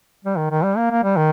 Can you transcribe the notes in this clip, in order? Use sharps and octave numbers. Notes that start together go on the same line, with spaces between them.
G3
D#3
D#3
G3
A#3
A#3
G3
D#3